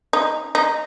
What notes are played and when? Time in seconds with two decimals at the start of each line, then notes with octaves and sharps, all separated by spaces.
0.13 D#4
0.55 D#4